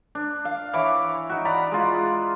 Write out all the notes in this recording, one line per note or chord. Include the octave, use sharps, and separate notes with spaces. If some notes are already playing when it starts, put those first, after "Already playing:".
D4
F5
E3 C#5 B5 D6
D#4 F#4
D5 A#5 B5
G#3 F4